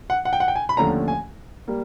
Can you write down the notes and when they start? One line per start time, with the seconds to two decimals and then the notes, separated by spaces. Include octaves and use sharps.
0.10 F#5
0.25 F#5
0.33 G5
0.40 F#5
0.48 G5
0.55 G#5
0.69 B5
0.77 D#2 D3 F3 A3 C#4 A#5
1.08 G#5
1.68 G3 A#3